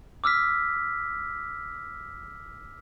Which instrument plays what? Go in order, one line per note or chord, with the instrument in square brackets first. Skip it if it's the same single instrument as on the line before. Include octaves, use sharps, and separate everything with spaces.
[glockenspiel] D6 E6 F6 B6